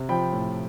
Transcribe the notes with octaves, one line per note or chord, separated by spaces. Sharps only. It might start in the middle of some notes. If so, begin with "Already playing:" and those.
Already playing: C3
F3 G5 B5
A2